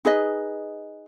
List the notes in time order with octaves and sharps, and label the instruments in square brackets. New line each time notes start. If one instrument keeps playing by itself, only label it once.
[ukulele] D#4 G#4 B4 D#5